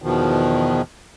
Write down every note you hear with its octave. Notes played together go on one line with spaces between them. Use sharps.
E2 B2 D#3 F3